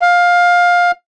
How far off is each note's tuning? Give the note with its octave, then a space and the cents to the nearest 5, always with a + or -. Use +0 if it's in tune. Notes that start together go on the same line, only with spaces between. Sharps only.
F5 +15